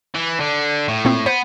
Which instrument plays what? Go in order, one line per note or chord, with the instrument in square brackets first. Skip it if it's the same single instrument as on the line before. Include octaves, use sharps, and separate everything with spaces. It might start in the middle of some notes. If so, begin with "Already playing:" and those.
[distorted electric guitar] E3
D3
A2
[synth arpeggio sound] A#2 C4
[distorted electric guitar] B3 [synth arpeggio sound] C5